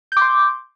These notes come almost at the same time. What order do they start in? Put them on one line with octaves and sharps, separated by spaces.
G6 D6 C6